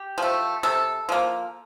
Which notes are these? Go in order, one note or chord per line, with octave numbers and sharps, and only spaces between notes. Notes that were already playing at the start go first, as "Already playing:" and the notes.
Already playing: G4
F3 A3
C3 A4
F3 A#3